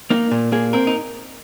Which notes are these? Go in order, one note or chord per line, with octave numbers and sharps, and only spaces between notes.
A#3 D#4
A#2
A#3 G#4
C4 A#4
D#4